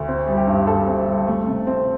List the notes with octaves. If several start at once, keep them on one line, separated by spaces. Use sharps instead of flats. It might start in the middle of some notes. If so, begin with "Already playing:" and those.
Already playing: D2
C4
G3
G4
G2
G2 A4
C4
G3
A3
C3
C4